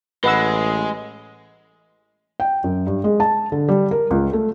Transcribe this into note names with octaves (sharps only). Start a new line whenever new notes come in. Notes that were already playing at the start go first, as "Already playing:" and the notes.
A1 G#3 B4 F#5 E6
G5
F#2
G2
G#3
A5
D3
G3
A#4
C#2
A3